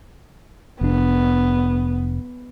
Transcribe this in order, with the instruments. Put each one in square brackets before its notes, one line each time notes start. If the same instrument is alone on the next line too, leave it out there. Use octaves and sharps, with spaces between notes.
[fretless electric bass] F1 D4 [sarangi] B3